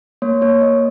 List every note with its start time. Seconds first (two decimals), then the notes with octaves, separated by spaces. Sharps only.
0.22 A#3 C#5
0.42 A#3 C#5
0.62 A#3 D#5